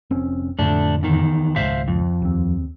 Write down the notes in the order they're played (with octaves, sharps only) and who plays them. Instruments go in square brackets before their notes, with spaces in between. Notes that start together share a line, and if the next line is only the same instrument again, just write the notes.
[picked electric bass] F1 C4 C#4
[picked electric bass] F2 A2 D3 [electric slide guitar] A3 D4
[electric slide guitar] E2 D#3
[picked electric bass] G#1 C#2 [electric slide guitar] C5 E5 F5
[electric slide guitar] F2
[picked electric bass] D#2 C4